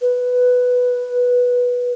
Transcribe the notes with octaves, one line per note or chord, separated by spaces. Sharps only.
B4